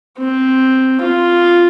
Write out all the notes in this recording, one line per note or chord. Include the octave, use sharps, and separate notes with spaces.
C4
F4